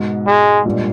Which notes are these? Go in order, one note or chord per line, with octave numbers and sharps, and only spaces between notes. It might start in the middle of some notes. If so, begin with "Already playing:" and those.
Already playing: G#2 B2
G#3
G2 A#2